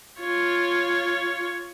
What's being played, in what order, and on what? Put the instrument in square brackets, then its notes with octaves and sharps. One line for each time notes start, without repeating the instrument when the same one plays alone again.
[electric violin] F4 C#5